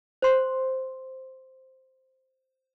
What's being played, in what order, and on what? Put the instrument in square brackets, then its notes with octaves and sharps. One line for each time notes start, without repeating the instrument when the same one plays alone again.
[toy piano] C5 C6